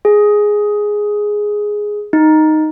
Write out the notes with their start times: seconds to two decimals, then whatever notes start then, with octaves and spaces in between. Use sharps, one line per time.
0.05 G#4
2.13 D#4